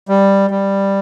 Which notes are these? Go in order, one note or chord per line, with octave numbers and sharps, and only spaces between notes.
G3
G3